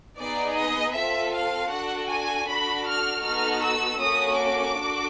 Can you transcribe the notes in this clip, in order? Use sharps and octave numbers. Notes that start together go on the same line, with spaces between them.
B3 D#4 G#4 D5
D#5
C4 F4 A4 E5
F5
D4 F#4 A4 F#5
G#5
D4 F#4 A4 B5
F6
B3 D#4 F#4 A4 F6
E6
A#3 C#4 F#4 A4 D#6
D6
D4 F#4 A4